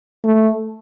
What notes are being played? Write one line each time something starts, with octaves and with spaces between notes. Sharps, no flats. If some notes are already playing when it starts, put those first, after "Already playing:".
A3